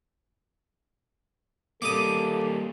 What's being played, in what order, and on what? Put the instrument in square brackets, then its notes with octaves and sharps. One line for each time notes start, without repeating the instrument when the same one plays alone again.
[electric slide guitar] G3 A#3 [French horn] A4 [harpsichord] D6 D#6